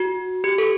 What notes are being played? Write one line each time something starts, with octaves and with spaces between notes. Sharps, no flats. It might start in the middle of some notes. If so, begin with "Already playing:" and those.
Already playing: F#4
G4
A4